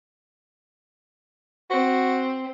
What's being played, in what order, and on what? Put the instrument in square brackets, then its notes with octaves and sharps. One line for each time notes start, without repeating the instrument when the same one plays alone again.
[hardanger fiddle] C4 [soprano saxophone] F#4